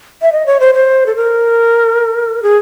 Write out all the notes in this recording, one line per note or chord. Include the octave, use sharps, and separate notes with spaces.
E5
D#5
C#5
C5
C5
A4
A#4
G#4